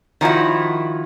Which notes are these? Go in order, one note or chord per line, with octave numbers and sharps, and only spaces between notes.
D#3 F3 E4 F#4